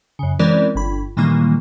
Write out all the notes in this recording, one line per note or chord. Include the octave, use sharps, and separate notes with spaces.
F#2 C#3
E3 G#3 C4 C#4 A#4 D5
G1 B5
A#2 D#3 E3 G3 G#3 A#3